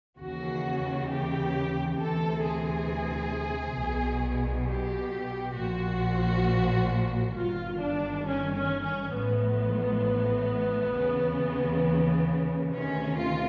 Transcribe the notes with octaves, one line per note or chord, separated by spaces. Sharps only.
D#2 C#3 E3 F#4
G4
D2 C3 E3 A4
G#4
B1 B2
G4
A#1 A#2 F3 F#4
G1 G2 D#3 F4
D4
C#4
C#4
C#4
A1 A2 F3 B3
D#2 C#3 E3
D2 C3 D#3 C#4
F4